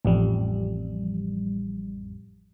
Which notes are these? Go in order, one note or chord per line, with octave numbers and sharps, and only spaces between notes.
A1 F2 G3